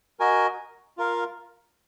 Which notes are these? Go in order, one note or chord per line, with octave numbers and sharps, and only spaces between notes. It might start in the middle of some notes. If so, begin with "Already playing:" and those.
F#4 A#4 D#5 G#5
F4 A#4 F5